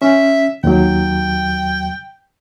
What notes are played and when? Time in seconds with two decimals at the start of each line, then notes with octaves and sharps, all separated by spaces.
0.02 C#4 E5
0.64 D#2 F#3 G5